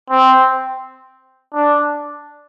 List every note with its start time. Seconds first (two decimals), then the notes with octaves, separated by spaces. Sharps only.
0.10 C4
1.54 D4